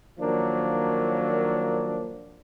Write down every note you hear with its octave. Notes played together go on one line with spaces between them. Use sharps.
D#3 F3 F#3 A#3 D4